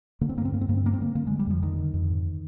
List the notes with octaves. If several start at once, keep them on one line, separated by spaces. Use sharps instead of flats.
D3 A#3
C4
G2 A#3
C4
G2 A#3
C4
G2 A#3
C4
D3 A#3
C4
D3 A#3
D3 A#3
D3 G#3
G3
F2 F3
D3 D#3
D3
F2
G#2